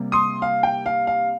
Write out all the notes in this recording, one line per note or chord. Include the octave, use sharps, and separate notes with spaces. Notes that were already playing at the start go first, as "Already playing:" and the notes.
Already playing: C3 G3 A#3
C6 D#6
F5
G5
F5
F5